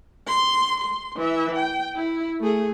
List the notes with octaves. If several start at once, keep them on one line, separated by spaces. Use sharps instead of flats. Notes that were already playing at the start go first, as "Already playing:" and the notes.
C6
C6
E3 E5
G5
E4
A3 G#4